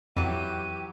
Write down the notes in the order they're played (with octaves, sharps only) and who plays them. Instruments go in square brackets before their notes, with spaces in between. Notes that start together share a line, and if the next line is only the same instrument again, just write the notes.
[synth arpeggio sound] F2 [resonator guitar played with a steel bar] E3 F#3 [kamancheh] G4 [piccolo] D#7